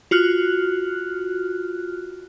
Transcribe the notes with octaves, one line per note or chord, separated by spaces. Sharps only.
F4 F#4 F6 F#6